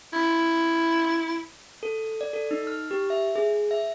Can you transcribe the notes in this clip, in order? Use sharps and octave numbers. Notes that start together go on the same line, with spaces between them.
E4
A4
D5
A4
D#4
F6
G4
E5
G#4
E5